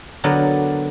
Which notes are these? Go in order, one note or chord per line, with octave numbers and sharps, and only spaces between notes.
D3 F#3 B3 A#4 D5